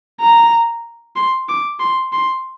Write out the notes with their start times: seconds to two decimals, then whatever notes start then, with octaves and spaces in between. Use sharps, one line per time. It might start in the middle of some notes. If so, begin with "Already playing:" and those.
0.21 A#5
1.16 C6
1.49 D6
1.80 C6
2.13 C6